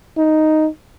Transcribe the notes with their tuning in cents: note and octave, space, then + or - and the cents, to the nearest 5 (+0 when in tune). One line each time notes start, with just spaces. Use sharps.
D#4 +0